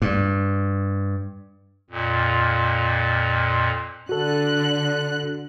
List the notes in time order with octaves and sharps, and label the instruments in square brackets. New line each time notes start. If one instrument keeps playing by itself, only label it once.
[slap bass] G2
[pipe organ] F2 A#2
[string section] D3 F#6 [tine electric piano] F#4 A4